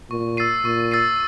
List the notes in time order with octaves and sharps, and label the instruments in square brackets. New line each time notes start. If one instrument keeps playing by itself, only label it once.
[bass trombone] A#2 [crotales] C#6
[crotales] E6 A6 C7 D#7
[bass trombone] A#2 [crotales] C#6
[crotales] E6 A6 C7 D#7